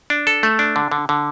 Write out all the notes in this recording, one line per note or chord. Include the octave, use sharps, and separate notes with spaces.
D4
A4
A3
D4
D3
D3
D3